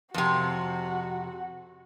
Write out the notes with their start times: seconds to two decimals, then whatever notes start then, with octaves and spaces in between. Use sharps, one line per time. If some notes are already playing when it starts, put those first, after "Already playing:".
0.14 F2 C3 F#4